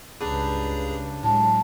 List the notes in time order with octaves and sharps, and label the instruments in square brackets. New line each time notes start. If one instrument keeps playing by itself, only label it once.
[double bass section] C#2 G2 C#3 [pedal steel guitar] D4 G4 B4 [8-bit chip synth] G#4 A#5
[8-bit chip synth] A2 [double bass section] F#3 G#3 [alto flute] A5